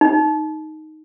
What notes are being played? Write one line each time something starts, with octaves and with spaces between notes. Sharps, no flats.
D#4